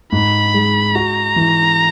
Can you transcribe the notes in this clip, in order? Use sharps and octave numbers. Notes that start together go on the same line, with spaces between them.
G#2 B5
G#3
F#4 A#5
E3